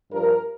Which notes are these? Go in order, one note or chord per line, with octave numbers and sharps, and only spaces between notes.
G2 F3 A#4